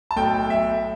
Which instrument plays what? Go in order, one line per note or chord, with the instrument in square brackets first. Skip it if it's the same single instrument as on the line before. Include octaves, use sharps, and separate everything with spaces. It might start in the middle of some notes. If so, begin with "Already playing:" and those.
[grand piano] A5
B1 A2 A3 G5
E5